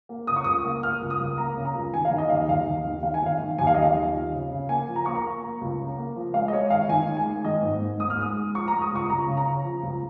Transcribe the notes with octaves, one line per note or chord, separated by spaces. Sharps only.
A#3
C#3 D#6
C#6
C#2 D#6
A#3
A#3 F6
C#2
D#6
C#2
A#3 A#5
C#3
A#5
C#2
D#3 G#5
F5
D#3
D#5
D#2 F5
D#2 F5
D#2
D#3
D#3 F5
G#5
D#3 F5
D#3
D#2 G#5
F5
D#3 D#5
F5
D#2
F3
C#3
C#3
A#3 G#5
F3
A#5
A#3 C#6
A#5
A#3
A#3
C#2
C#3
A#3
F3
G#3 F5
D#5
G#3 C#5
D#3 F5
D#3 G#5
G#3
G#5
G#3
D#3 D#5
G#2
G#2
G#2 D#6
F6
G#3 D#6
G#3
F3 C#6
G#3 A#5
D#6
C#2 C#6
C#2 A#5
C#3
A#5
C#3
F3
C#2